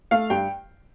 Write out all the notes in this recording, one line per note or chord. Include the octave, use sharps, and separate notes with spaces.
A3 F5
G2 G5